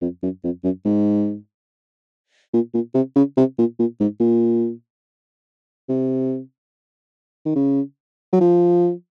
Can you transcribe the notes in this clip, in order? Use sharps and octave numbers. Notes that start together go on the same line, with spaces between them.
F2
F#2
F2
F#2
G#2
A#2
A#2
C3
C#3
C3
A#2
A#2
G#2
A#2
C3
D#3
C#3
F#3
F3